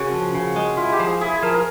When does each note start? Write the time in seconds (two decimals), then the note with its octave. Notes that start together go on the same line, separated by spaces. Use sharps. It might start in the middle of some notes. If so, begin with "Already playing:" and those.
Already playing: C#3 F#4 A#4
0.12 F3
0.35 C#3
0.56 G#3
0.77 E4 F4
0.92 G4
1.00 F3
1.06 G#4
1.21 E4 G#4
1.43 F3 A#4
1.54 A#4